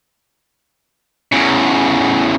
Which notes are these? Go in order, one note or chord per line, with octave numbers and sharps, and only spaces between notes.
E2 C#3